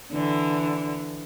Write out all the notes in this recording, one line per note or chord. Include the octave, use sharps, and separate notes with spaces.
D3 E3